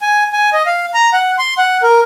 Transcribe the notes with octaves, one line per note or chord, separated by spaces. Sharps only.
G#5
G#5
D#5
F5
A#5
F#5
C6
F#5
A#4